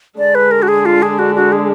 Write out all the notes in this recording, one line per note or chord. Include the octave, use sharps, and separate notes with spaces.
D3 G#3 D4 D5
B4
A#4
F#4
G#4
F4
G#4
F#4
F#4
G#4